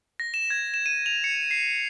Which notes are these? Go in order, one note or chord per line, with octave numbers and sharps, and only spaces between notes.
A#6
E7
G#6
E7
D#7
F7
C#7
C7